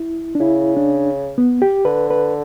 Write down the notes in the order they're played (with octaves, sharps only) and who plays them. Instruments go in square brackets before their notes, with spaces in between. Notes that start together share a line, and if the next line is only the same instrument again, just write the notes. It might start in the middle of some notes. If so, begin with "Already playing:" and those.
Already playing: [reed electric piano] E4
D4
[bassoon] C#3 [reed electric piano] E4
[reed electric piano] D4
B3
G4
[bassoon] D3 [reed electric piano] B4
[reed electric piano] B4